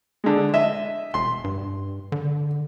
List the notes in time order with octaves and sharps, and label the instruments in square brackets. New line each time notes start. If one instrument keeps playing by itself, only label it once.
[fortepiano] D3 G#3
D#5 E5
[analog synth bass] E1 [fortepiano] C6
[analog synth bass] G2
D3